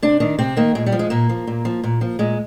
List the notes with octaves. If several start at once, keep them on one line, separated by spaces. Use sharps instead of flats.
C3 D4
D#3 D4
C3 C4
D#3 A#3
A#2 G#3
G3
F3
G#3
A#2 A#3
F3
A#2
F3
A#2
F3
A#2 G#3